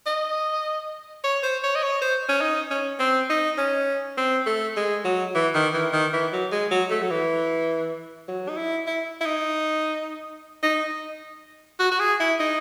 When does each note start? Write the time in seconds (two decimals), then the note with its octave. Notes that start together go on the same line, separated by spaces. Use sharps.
0.06 D#5
1.24 C#5
1.43 C5
1.63 C#5
1.75 D#5
1.83 C#5
2.02 C5
2.29 C#4
2.41 D#4
2.71 C#4
2.99 C4
3.30 D#4
3.58 C#4
4.18 C4
4.46 A3
4.76 G#3
5.05 F#3
5.35 E3
5.55 D#3
5.74 E3
5.93 D#3
6.13 E3
6.32 F#3
6.52 G#3
6.71 F#3
6.90 A3
7.02 F#3
7.10 E3
8.28 F#3
8.48 D#4
8.57 E4
8.87 E4
9.21 E4
9.26 D#4
10.63 D#4
11.80 F#4
11.92 F#4
12.00 G#4
12.20 E4
12.40 D#4